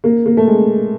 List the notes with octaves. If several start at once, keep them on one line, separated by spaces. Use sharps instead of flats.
A#3
A#3
A3
G#3